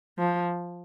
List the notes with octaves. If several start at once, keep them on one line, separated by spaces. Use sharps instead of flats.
F3